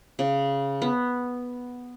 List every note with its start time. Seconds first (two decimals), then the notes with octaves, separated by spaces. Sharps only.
0.19 C#3
0.82 B3